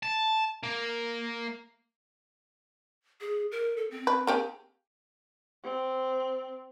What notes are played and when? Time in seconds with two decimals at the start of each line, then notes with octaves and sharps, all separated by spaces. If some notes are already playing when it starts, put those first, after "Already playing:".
0.03 A5
0.63 A#3
3.21 G#4
3.52 A#4
3.77 A4
3.91 C4
4.07 B4
4.27 A#3 G4 G#4
5.64 C4